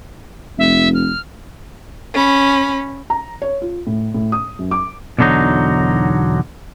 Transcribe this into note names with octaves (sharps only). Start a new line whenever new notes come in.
F1 E5
F6
C#4 B5
A#5
C#5
F4
A2
A2
D#6
F#2
D6
B1 E2 D3 F#3 D#4